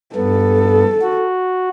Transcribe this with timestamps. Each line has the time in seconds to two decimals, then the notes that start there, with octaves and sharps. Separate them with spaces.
0.16 G2 B3 A4
1.02 F#4